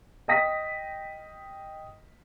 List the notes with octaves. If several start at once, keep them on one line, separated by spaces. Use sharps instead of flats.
D#5 G5 D#6 A#6 B6